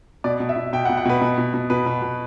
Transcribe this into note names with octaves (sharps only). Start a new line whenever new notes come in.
B2 D5
B2
E5
B2
B2 G5
F#5
B2
F#5
B2 B4
B2
B2
B2
B2 B4
B2
B2